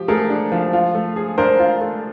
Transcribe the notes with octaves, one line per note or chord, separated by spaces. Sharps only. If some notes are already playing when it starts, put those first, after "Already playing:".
Already playing: F3 G4
A3 G#4 A#4
D4
F3
F4
A3
G#4
D4 A#4 C5
F4
A3